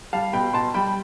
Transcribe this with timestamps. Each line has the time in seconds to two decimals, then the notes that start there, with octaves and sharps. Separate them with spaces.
0.13 G3 F5 A5
0.33 B2 G5 B5
0.53 B2 A5 C6
0.74 G3 G5 B5